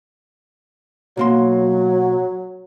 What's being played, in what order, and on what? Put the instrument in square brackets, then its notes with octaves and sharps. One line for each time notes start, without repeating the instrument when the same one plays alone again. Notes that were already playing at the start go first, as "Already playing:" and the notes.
[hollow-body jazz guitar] B1 A#3 C6 [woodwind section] F#3